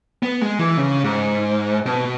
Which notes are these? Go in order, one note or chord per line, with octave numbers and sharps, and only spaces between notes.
B3
G#3
E3
C#3
G#2
B2